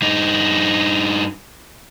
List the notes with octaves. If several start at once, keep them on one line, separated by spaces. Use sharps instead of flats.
G2 D#4